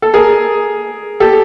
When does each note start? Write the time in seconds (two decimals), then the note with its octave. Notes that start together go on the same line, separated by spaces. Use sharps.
0.02 A4
0.14 G#4 A#4
1.20 G4 A4